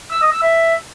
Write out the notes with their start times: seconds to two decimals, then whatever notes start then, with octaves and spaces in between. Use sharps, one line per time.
0.12 E6
0.22 D#5
0.32 E6
0.42 E5